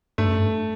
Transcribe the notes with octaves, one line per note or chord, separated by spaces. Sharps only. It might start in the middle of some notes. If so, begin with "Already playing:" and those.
G2 A3
F#2
G2